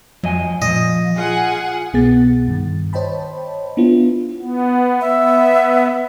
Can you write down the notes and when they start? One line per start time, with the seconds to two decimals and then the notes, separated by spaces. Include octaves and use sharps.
0.23 F2 F#3 D#5 G#5
0.62 A#2 F3 G3 D#5
1.18 F4 G#4 F#5 G#5
1.93 C2 B2 B3 G#4 F#5 A6
2.48 G2 D#3
2.93 C5 C#5 D#5 G5 A5 B5
3.77 B3 D4 E4 F4
4.39 B3
5.01 B3 E5